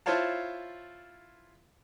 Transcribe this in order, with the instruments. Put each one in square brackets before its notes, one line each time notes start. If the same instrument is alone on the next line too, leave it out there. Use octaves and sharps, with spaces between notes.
[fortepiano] E4 F4 C5 C#5 F5 A5